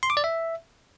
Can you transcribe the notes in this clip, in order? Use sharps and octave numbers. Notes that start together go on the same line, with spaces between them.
C6
D6
D5
E5